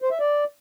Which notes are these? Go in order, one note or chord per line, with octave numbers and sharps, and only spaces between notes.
C5
E5
D5